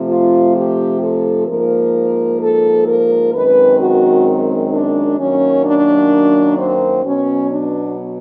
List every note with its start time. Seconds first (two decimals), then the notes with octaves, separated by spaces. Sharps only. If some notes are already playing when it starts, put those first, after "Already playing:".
Already playing: C3 F3 A3
0.09 F4
0.56 G4
1.02 A4
1.49 G#2 F3 A#3 A#4
2.42 A4
2.88 A#4
3.34 F#2 D#3 G#3 C4 B4
3.80 F#4
4.73 D4
5.19 F#2 D#3 F#3 A#3 C#4
5.66 D4
6.58 C4
7.05 B2 F#3 B3 C#4
7.51 D4